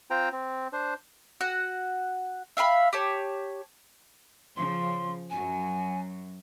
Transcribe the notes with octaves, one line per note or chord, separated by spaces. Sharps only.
C4 F4 C5 G5 A#5
C4
D4 C5
F#4 F#5
E5 F5 G5 B5
G4 C#5 A5
C#3 F3 C6
F#2 F#3 G#5